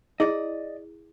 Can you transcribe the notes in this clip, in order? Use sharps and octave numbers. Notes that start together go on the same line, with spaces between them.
E4 G#4 D5 D#5